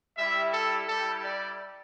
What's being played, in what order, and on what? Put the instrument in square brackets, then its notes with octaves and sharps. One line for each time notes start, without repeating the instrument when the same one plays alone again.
[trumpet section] G3 E4 G4 E5
A4
G3 E4 G4 A4
D5